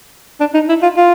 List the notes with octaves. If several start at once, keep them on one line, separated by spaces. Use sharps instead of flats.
D4
D#4
E4
F4
F4